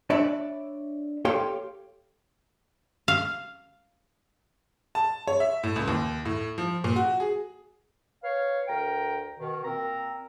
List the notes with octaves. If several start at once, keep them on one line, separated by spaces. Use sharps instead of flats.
D4 C#5 D5 E5 B5
G4 A4 C#5 F5 G5 C6
F5
A5
C#5
E5
A2
C#2
D#2
A2
F3
A#2
F#4
G#4
B4 C#5 F5
D2 A#4 G5 A#5
B2 D#3
A#2 C4 A#4 A#5